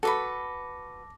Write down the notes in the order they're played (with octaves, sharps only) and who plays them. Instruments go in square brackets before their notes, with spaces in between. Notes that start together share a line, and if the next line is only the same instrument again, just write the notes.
[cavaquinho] F#4 B4 B5 [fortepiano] A4 [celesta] A5 D6 A#6